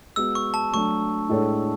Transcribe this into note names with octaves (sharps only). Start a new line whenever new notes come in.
G#3 B3 F#4 E6
C#6
A5
F#3 A3 D4 C#6
A2 G#3 D4 A4 C#5